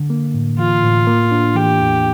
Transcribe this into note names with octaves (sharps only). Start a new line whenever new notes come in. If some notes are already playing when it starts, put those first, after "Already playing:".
Already playing: D3
A#3
A2
E3 F4
A2
A#3
D4
E3 G4
E2